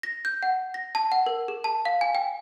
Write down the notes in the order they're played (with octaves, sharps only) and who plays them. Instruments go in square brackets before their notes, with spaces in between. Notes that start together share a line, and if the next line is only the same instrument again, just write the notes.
[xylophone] A#6
G6
F#5
A#6
A5
F#5
A#4
G#4
A5
F5
G#5
G5